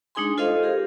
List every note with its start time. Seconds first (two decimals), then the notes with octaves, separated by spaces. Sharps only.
0.15 G#3 D4 D#4 G#4 G#5 C6
0.38 F4 A4 C5 D#5 F5
0.63 G4 G#4 A#4